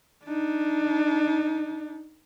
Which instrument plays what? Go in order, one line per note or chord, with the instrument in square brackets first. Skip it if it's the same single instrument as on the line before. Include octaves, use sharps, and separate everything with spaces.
[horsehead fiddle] D4 D#4